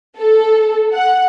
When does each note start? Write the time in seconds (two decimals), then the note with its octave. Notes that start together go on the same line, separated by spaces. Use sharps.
0.18 A4
0.93 F#5